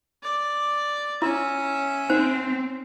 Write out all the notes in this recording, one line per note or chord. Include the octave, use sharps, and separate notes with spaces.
D5
C#4 E4 E5
C4 D#4 C5